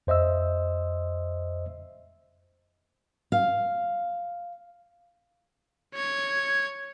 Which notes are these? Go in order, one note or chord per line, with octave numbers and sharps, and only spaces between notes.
F2 C5 D#5 E5 E6
F5
C#5 G#6